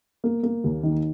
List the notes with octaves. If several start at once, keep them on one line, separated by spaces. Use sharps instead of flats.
A#3
A#3
D#2
D#3